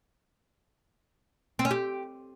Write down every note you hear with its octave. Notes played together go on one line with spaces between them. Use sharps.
C4
C#4
G4